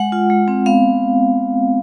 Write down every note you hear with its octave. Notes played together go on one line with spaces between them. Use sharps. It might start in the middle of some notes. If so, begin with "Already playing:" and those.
Already playing: G#3 F#5
F4
G#3
C4
B3 F5